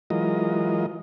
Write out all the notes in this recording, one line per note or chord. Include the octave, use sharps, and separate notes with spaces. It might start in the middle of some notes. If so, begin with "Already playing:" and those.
E3 F#3 G#3 F4 A#4 D#5